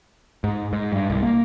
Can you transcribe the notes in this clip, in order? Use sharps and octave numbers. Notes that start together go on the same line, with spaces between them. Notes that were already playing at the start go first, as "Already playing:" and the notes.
G#2
G#2
G2
C2
A#3